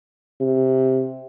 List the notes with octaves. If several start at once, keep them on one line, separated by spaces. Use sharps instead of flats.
C3